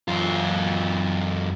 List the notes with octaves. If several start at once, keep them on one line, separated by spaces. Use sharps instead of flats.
F#2 F4